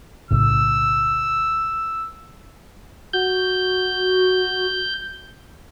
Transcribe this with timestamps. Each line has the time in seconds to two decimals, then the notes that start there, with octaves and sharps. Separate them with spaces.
0.31 B1 A2 C#3 E6
3.13 F#4 G6